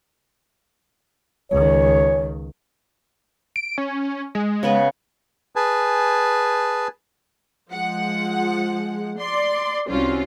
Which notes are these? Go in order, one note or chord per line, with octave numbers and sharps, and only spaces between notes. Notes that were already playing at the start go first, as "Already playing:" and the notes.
C#2 D#3 C#5
D7
C#4
G#3
C#3 B3 B4
G#4 B4 G#5 A5
F3 G#3 F#5
D5 C6
C2 C4 C#4 F4 F#4